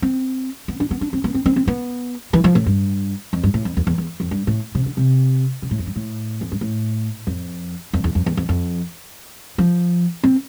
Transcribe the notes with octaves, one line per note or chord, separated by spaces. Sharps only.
C4
B3
D4
B3
D4
C4
B3
C4
C4
C4
B3
E3
F3
A2
G2
F2
G2
A2
F2
E2
E2
E2
F2
G2
A2
C3
D3
C3
C3
A2
F2
G2
A2
F2
G2
A2
F2
F2
E2
F2
E2
F2
F2
F3
C4